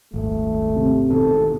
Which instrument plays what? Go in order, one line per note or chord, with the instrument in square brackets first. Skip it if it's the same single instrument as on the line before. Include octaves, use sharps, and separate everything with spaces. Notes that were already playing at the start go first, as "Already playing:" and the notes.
[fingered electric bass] D#1 G#1 [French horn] A3
[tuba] C3
[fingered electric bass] G#1 B2 D#3 [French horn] A4